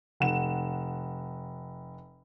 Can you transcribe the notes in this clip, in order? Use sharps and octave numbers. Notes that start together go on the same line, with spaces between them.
F1 F#5 E7